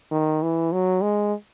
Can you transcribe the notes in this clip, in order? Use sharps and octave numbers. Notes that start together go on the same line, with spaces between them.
D#3
E3
F#3
G#3